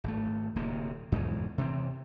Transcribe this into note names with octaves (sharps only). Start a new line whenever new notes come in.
G#1 A3
D1 D#2 C3 A#3
E2 G#2 B2 E3
C3 E3 G3 C4